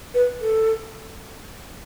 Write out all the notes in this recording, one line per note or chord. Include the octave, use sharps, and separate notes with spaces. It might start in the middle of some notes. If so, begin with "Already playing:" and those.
B4
A4